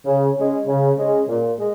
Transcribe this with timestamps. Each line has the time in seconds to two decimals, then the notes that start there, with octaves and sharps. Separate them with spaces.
0.06 C#3
0.37 G#3 C#4
0.67 C#3
0.98 G#3 C#4
1.29 A#2
1.59 G#3